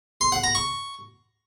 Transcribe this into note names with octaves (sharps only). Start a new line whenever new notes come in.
C6
F#5
A#5
C#6